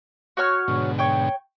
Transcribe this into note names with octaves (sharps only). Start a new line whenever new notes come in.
F#4 C#5 F6
G#2 B2 D3
C#5 G5